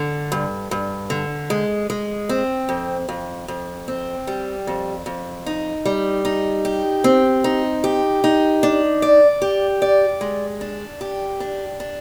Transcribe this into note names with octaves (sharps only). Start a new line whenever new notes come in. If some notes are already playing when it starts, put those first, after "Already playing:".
Already playing: D3
G2
G2
D3
G#3
G#3
C4
F2
F2
F2
C4
G3
F2
F2
D#4
G3
D#4
G4
C4
D#4
G4
D#4
D4
D5
G4
D5
G#3
D4
G4
D4
D4